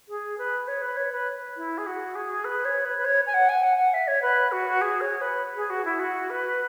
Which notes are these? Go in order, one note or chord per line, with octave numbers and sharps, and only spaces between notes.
G#4
B4
C#5
B4
C#5
B4
E4
G#4
F#4
G#4
B4
C#5
B4
B4
C#5
G#5
F#5
G#5
F#5
F#5
E5
C#5
B4
F#4
G#4
C#5
B4
G#4
F#4
E4
F#4
B4